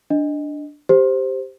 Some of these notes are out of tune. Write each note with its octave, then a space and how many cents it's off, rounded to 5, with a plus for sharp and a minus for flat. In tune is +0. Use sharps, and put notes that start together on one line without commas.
D4 +0 D#5 +0
G4 +0 C5 +0